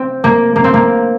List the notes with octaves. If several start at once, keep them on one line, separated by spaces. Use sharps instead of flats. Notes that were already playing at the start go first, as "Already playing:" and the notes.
Already playing: C4
A#3
A#3
C4
A#3